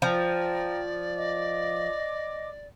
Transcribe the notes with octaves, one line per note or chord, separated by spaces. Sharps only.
F3 D5 G5 A#5
D#5 D6